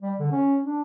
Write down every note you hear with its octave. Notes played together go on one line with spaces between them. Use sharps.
G3
D3
C#4
D4